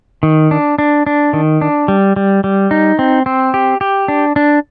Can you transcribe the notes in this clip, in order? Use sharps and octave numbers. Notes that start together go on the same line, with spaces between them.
D#3
D4
D4
D4
D#3
D4
G3
G3
G3
D#4
C4
C4
G4
G4
D4
D4